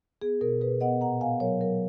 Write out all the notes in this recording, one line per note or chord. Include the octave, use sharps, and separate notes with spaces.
B3 G#4
B2 A#4
B2 G#4 B4
B3 D#5 F#5
A#2 F#5 A#5
B3 F5 G#5
F#3 A#4 C#5
F#3 A#4